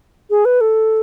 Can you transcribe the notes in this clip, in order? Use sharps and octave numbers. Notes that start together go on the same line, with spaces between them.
G#4
B4
A4